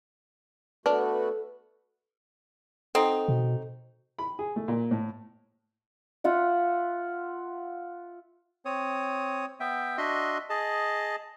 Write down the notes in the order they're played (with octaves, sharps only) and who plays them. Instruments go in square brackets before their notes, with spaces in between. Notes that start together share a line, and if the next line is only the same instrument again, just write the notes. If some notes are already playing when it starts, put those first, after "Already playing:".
[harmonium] A3 B3 F#4 [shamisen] D4 [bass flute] A4 [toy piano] B4
[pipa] F#3 C4 D#4 [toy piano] A4
[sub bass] B2
[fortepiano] B5
G#4
A3
A#2
A2
[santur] F4 E5 F#5
[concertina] C4 C#5 D#6
B3 E5 G5
D4 F#4 D#5 E5 C6
G#4 D#5 A5